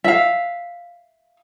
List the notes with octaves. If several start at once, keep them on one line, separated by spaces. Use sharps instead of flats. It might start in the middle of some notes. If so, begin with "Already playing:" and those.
E5 F5